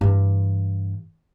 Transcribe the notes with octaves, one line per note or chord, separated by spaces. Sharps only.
G2 E3